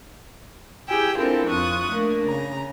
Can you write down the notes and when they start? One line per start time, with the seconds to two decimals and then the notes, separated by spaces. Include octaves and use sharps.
0.89 E4 G4 G#4 G5 E6
1.18 C4 D4 E4 F4 A4 A#4
1.48 F2 F4 C#6 D#6 F#6
1.92 A3 A#3 D4
2.25 C#3 A#5